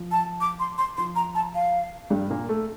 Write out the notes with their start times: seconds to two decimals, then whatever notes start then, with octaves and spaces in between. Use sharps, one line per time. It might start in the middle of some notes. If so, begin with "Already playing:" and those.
Already playing: F3
0.11 A5
0.41 D6
0.60 C6
0.78 C6
0.97 F3 C6
1.16 A#5
1.35 A5
1.54 F5
2.10 G2 G3
2.30 A#2 A#3
2.49 A3 A4